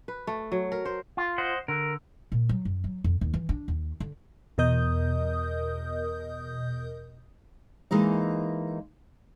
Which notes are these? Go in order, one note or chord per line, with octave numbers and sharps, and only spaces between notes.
B4
A3
F#3
A#4
C5
F4
C5 D#5 F#5
D3 A#4
A#2
F#3
F#2
F#3
F2
D#2
E3
D4
D#2
D3
E2 B2 A#4 D#5 D#6 G6
E3 G#3 A#3 D#4